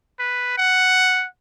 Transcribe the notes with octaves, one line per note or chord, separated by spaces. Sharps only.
B4
F#5